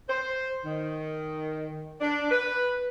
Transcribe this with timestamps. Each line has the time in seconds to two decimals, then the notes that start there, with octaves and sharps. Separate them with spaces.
0.09 C5
0.65 D#3
2.01 D4
2.31 B4